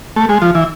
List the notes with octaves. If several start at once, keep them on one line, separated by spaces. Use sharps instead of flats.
A3
G#3
F3
E3